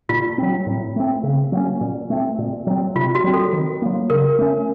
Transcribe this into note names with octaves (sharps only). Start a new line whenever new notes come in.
A#2 F4
F#3 C4
A2
A3 C4
C#3
F#3 A#3 C#4
A#2
A3 C4
A#2
F#3 C4
C3 F4
F#4
F#3 C4
A4
D#3
F#3 A#3
C#3 A#4
A3 C#4